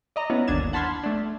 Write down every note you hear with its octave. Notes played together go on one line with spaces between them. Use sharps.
D5 D#5 A#5
B3 C#4 E4
G1 D#2 D4 G#6 E7
F#5 A5 B5 C6 F6 G#6
A3 D4